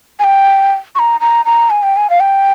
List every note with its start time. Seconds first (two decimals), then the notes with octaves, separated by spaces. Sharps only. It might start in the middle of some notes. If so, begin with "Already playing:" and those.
0.19 G#5
0.24 G5
0.95 C#6
0.99 A#5
1.20 A#5
1.46 A#5
1.70 G#5
1.83 G5
1.97 G#5
2.10 F5
2.20 G5